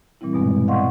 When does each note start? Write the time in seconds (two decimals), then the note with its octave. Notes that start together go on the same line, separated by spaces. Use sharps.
0.21 A#2 E3 G3 C4 E4
0.33 G2 B2 G#3 B3
0.67 D5 D#5 F5 F#5 C6 C#6